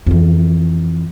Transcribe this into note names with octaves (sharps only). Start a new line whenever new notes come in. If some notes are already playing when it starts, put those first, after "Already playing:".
F2 E3